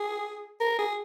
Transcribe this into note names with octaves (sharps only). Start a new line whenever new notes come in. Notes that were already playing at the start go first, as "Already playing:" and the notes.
Already playing: G#4
A#4
G#4